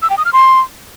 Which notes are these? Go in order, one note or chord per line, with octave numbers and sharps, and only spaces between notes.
E6
G5
D#6
F6
C6